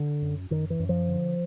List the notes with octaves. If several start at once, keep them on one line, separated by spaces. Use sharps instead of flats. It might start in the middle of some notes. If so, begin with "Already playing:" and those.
Already playing: D3
F#2
F#2 D#3
E3
F#2
F3
D3